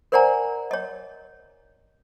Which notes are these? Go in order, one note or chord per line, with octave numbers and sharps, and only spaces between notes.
A#4 C5 D5 F#5 G#5 A#5
C#5 D#5